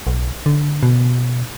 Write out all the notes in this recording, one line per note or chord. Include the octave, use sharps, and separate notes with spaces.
B1
D3
B2